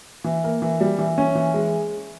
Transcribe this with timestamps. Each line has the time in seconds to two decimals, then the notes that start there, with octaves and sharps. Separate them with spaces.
0.24 E3
0.44 A#3
0.62 E3
0.81 G3
0.99 E3
1.18 C#4
1.35 E3
1.54 G#3